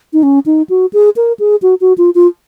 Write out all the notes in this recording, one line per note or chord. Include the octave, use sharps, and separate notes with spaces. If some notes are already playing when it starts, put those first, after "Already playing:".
D#4
C#4
D#4
F#4
G#4
A#4
G#4
F#4
F#4
F4
F4